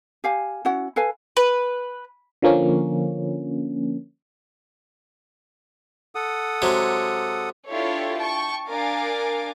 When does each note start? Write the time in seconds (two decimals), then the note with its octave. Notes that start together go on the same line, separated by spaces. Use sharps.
0.24 G4 F5 G#5
0.65 C#4 E4 F#4 F#5
0.96 A4 B4 F5 G#5
1.37 B4
2.42 D3 F3 A#3 C#4
6.15 A4 F#5 D#6
6.62 C3 F#3 G#3
7.70 D4 E4 F4 G4 A4 C#5
8.17 G5 A5 C#6
8.69 D4 A#4 F5 G#5 D6